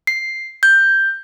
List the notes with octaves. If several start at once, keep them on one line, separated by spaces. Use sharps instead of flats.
C7
G6